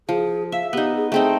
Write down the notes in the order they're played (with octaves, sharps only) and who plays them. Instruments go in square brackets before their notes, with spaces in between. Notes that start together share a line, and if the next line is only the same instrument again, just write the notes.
[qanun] F3 [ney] G#4
[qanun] E5 [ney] F5
[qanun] B3 D#4 [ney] G4
[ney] G#4
[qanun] A3 C4 D#4 [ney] G#4